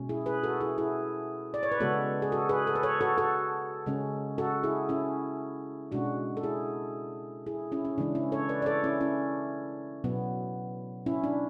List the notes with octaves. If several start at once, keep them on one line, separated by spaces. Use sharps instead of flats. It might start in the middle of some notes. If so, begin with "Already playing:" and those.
Already playing: B2 G#3 C#4
E4 G#4
G#4 B4
F#4 A4
E4 G#4
E4 G#4
D5
C#5
B4
C#3 G#3 B3 F#4 A4
G#4
F#4 A4
G#4 B4
A4
B4
A4 C#5
F#4 A4
F#4 A4
C#3 G#3 C#4
F#4 A4
E4 G#4
C#4 E4
B2 G#3 C#4 D4 F#4
A4
E4 G#4
E4 G#4
C#4 E4
C#4
C#3 E3 G#3 C#4 D4
C#4 E4
A4 C#5
B4 D5
D5
A4 C#5
C#4 E4
C#4 E4
B2 F#3 B3
C#4 E4
D4